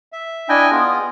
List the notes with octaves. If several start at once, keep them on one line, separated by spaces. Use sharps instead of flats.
E5
D4 E4 D#5 G5 G#5
B3 F4 G#4